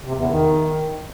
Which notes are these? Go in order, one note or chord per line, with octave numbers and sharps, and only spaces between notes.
C3
E2
D#3